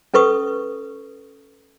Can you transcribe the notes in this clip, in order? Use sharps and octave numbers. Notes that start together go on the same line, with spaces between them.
C#4 A4 B4 C#6 D#6